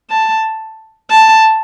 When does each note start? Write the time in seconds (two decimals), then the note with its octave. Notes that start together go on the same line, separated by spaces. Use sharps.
0.10 A5
1.10 A5